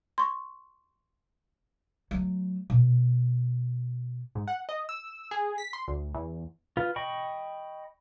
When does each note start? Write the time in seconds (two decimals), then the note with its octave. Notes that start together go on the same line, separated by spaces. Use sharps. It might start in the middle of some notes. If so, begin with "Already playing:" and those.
0.18 C6 C#6
2.11 F#3 A3
2.70 B2
4.35 G#2
4.48 F#5
4.69 D#5
4.89 E6
5.31 G#4
5.58 B6
5.73 C6
5.88 D2
6.15 E2
6.77 F4 B4
6.96 D#5 G5 B5 C#6